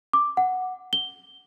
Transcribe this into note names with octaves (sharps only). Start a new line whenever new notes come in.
D6
F#5
G7